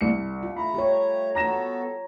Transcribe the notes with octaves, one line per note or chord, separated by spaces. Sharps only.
C2 C#7
F4
A3 A#5 B5
G4 C#5
B3 F#4 A4 A#5 A#6 E7